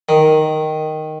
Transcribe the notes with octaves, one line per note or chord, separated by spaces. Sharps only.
D#3